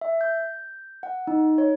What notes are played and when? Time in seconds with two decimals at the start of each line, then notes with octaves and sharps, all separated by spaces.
0.01 E5
0.21 G6
1.03 F#5
1.27 D#4
1.58 C#5